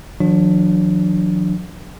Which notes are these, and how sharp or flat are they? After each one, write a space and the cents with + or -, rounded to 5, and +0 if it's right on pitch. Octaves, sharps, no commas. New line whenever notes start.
D#3 +35 F#3 -40 D4 +0